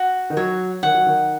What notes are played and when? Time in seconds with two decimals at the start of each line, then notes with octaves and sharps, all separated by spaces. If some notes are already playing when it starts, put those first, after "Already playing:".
Already playing: F#4
0.30 D#3
0.37 F#3 C#5
0.83 D#3 F#5
0.94 F#3
1.06 D#3